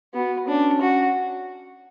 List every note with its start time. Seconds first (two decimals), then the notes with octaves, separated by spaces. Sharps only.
0.14 B3 F#4
0.47 C#4 D4
0.81 F#4